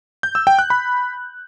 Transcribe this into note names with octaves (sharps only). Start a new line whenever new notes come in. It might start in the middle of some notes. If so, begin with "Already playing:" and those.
G6
E6
G5
F#6
B5